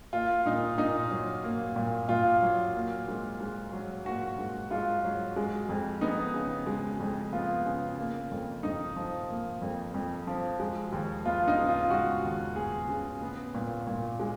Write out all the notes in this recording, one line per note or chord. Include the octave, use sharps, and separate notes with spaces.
A#3 F4
A#2 D#4
A#2 D#4
F#3
A#3
A#2
A#2 F4
F#3
A#3
G#2
G#2
F#3
A#3 F#4
G#2
G#2 F4
F#3
G#3
F2
B3 D#4
C#3
G#3
F2
B3 F4
C#3
A#3
F2
F2 D#4
F3
A#3
F2
F2
F3
G#3
D#2
B3 F4
D#4
C#3
F4
G#3 F#4
D#2
B3 G#4
C#3
B3
A#2
A#2
G#3